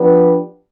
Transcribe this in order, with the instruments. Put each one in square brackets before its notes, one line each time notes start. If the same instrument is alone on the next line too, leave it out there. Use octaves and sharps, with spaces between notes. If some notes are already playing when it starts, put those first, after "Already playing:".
Already playing: [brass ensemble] F3 B3 D4 G4 B4